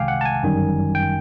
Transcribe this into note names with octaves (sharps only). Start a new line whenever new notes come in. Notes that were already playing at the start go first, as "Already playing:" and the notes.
Already playing: C2 C3 D#3 G#3 F5 G5 G#5 D6
F#5
A5
G#5
G1 F#2 D#3 G3
G5